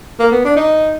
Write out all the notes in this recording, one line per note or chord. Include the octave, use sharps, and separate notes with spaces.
A#3
B3
D4
D#4